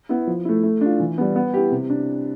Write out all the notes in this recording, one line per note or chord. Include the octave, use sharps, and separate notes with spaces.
B3 E4
F3
A3 E4
A3
D4 F4
E3
G3 B3
B3
E4 G4
C3
D4